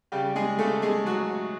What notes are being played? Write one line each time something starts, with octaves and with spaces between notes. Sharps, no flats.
C#3 G3 G4
G#3 G#4
C#3 A3 A4
G#3 G#4
F#3 F#4